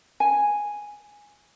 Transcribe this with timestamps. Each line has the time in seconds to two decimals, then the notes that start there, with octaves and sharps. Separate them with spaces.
0.20 G#5